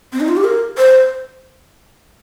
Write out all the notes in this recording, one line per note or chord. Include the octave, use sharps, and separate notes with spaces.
C4
D#4
F4
G4
A#4
C5